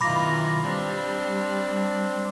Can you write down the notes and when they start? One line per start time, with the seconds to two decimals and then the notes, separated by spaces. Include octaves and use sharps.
0.01 B1 D#3 E3 F4 A#5 B5 D6 A#6
0.64 G3 C4 D4